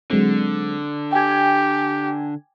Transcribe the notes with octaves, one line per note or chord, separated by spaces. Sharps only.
D3 F#3 G#3 C4
G4 G5 G#5 G#6